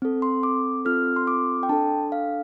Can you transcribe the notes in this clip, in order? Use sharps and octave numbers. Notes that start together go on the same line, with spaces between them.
C4 A4
C6
D6
C4 F4 A4 F6
C6
D6
G5
D4 A4 A5
F5